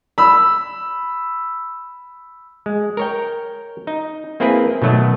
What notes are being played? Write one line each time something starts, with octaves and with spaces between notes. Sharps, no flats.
B5 E6
G#3
A#4 C#5 G5
D#4
A#3 C4 E4 G#4 A#4 B4
B2 D#3 F#3 A3